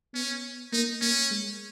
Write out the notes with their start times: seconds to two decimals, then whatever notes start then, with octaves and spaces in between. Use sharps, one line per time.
0.14 B3 C#4
0.73 A#3 D#4
1.01 A#3 C#4
1.31 G#3